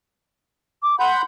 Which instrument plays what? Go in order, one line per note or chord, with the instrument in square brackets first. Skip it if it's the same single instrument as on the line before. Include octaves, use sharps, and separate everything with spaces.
[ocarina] D6
[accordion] F#5 B5 G6 [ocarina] C6